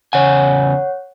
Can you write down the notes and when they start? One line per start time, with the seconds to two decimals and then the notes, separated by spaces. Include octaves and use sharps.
0.13 E2 C#3 C#5 F#5 G#5